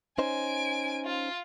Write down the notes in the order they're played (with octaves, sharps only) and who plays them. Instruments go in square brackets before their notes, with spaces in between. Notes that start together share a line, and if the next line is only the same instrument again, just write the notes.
[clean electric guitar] C#4 D#4 C5 [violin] G#5 D7
[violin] F4